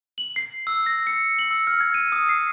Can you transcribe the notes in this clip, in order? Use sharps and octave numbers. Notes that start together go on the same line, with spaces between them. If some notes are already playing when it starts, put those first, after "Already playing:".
F#7
C7
E6
A#6
C#7
F#7
E6
F6
G#6
D#7
D#6
C7